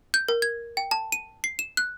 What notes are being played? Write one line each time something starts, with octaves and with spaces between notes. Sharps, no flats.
G6
A#4
G#6
G5
A5
D#7
C7
E7
F#6